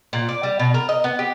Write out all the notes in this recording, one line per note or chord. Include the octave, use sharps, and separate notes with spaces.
A#2
D5
G3
B2
A#4
D#5
B3
G4